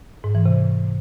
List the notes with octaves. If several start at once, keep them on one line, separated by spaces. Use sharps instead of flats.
G#2
E3
C3